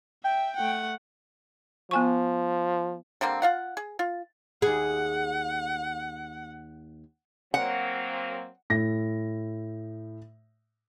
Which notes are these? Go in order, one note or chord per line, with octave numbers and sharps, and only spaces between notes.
E5 G5
A3 F#5
F3 B3 G#5 C#6
D3 G3 A#3 C4
F4 F5 F#5
G#4
F4
D#2 G#4 F#5
F#3 A#3 C4 F#5
A2 A#6